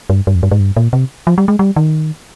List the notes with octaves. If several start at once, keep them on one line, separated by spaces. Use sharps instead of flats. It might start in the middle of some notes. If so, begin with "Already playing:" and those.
G2
G2
F2
G2
G#2
G2
A#2
C3
F3
G3
G#3
G3
D#3